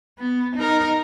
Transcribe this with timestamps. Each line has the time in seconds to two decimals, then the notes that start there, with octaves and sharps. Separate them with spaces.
0.19 B3
0.56 D#4 A#4